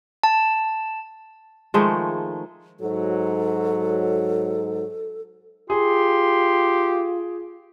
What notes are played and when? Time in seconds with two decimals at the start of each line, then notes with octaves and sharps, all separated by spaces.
0.24 A5
1.74 D#3 F3 G#3 A3
2.80 G#2 F#3 A4
5.70 F4 G4 G#4 C6